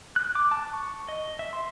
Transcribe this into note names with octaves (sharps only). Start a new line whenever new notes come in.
F#6
D6
A5
C#6
D#5
E5
C6